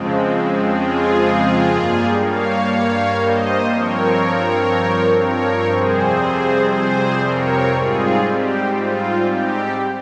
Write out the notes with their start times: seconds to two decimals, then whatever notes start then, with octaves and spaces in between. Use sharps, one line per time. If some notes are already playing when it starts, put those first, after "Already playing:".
Already playing: F2 C#3 F3 G#3 C4
0.69 F4 G#4
1.70 G2 G3 A#3
2.21 C#5 F5
2.70 C#5 F5
3.20 C5 D#5
3.70 G2 F3 C4 A#4 C#5
5.22 A#4 C#5
5.71 F2 C3 G3 C4 G#4 C5
6.72 G#4 C5
7.22 A#4 C#5
7.73 G#2 G3 C4 F4 G#4
8.22 G4
8.74 F4
9.24 G4